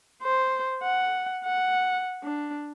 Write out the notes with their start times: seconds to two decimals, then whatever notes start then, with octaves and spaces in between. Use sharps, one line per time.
0.23 C5
0.83 F#5
1.45 F#5
2.23 D4